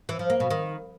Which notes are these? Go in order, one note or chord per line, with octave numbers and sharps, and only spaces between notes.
E3
F3
A#3
B2
D#3